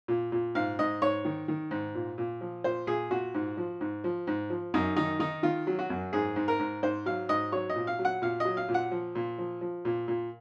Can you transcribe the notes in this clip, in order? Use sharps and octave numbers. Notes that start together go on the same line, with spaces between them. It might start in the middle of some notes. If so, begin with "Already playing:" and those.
A#2
A#2
G#2 F5
G#2 D#5
G#2 C#5
D#3
D#3
G#2
A#2
A#2
F3
A#2 C5
A#2 G#4
A#2 F#4
G#2
F3
G#2
F3
G#2
F3
F#2 D#4
D#3 D#4
D#3 D#4
D#3 F4
F#3
F#4
F#2
G#2 G#4
G#2
A#4
G#2
G#2 C5
F#3 F5
G#2 D#5
F#3 C#5
D#5
A#2
F5
F#3
F#5
A#2 F5
F#3 D#5
F5
A#2
F#5
F3
A#2
F3
F3
A#2
A#2